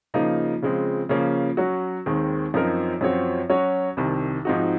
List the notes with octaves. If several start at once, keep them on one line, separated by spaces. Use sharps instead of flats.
C#3 F3 A#3 D#4
C#3 F3 G#3 C4
C#3 F3 A#3 C#4
F#3 C#4 F#4
D#2 D#3 G#3 C4
F#2 F3 C4 D#4 A#4
F#2 F3 C4 F#4 C#5
F#3 C#4 F#4 C#5
C2 C3 D#3
G#2 F3 C4 D#4 F#4